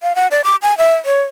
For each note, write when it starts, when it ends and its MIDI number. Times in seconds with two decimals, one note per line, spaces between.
0.03 0.15 77
0.15 0.27 78
0.31 0.41 74
0.44 0.56 86
0.62 0.77 80
0.78 0.95 76
1.06 1.22 73